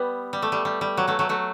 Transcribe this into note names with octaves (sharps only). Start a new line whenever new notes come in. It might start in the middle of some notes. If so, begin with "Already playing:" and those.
Already playing: G3 B3
G3
A3
G3
G3
G3
F#3
F#3 A3
F#3 A3
F#3 A3